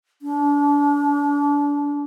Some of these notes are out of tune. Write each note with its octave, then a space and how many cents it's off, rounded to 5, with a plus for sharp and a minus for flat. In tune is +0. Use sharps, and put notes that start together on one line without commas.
D4 -30